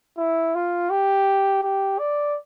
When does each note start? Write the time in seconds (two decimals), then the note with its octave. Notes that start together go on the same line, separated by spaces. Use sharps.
0.18 E4
0.55 F4
0.90 G4
1.63 G4
1.99 D5